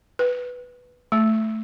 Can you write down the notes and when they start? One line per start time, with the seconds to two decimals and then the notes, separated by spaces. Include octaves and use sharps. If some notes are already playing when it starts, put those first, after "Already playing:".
0.19 B4
1.12 A3